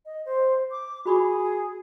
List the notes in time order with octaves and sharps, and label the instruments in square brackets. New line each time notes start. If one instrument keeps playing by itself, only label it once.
[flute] D#5
C5
D6
[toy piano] F#4 B5 C#6 [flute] G#4